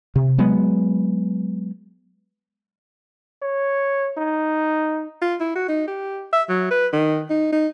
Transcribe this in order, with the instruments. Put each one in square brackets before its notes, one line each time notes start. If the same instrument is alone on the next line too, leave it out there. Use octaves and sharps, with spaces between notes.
[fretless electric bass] C3
F#3 G#3 B3
[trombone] C#5
D#4
[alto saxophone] F4
E4
F#4
D#4
G4
E5
F#3
B4
D#3
D#4
D#4